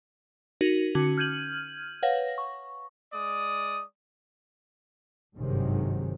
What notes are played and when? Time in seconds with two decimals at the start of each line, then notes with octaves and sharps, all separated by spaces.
0.61 D#4 F#4 A#4
0.95 D3 C#4 F#4
1.18 F6 G6 G#6 D#7 F#7
2.03 B4 C#5 F5 F#5 A#6
2.38 C#6
3.13 G#3 D5 D#6
5.36 G#1 G2 C3 D#3 F#3 G#3